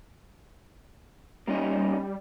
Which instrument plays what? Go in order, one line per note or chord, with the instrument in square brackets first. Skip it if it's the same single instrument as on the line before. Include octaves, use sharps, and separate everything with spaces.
[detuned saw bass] G3 [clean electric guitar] A#3 C#4 D#4